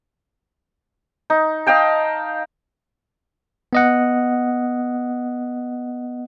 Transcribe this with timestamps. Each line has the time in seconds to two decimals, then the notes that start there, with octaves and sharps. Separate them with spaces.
1.30 D#4
1.67 D#5 F5 G5 A5
3.73 B3 D#5 F#5